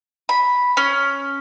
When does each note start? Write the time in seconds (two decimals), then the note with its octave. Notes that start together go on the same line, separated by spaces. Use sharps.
0.29 B5
0.77 C#4